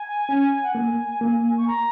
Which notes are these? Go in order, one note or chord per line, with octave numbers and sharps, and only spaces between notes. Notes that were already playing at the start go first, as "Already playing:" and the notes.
Already playing: G#5
C#4
F#5
A#3 G#5
A#3
C#6
A#5